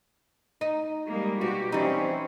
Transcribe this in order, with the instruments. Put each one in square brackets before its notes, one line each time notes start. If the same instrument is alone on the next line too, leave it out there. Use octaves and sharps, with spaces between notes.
[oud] D#4
[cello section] G3 G#3 A#3
[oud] B2 [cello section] F#4 G4
[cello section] E3 C4 C#4 [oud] G3 D#4